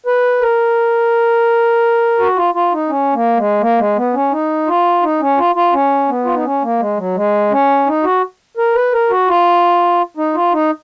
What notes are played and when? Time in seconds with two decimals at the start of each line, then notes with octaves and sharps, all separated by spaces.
0.06 B4
0.41 A#4
2.19 F#4
2.36 F4
2.54 F4
2.72 D#4
2.89 C#4
3.13 A#3
3.37 G#3
3.61 A#3
3.78 G#3
3.96 B3
4.14 C#4
4.32 D#4
4.67 F4
5.02 D#4
5.20 C#4
5.37 F4
5.55 F4
5.73 C#4
6.09 B3
6.25 F4
6.34 D#4
6.44 C#4
6.62 A#3
6.80 G#3
6.97 F#3
7.15 G#3
7.51 C#4
7.86 D#4
8.04 F#4
8.57 A#4
8.74 B4
8.93 A#4
9.10 F#4
9.28 F4
10.17 D#4
10.34 F4
10.52 D#4